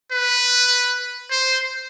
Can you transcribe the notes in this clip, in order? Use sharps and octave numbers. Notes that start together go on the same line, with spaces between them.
B4
C5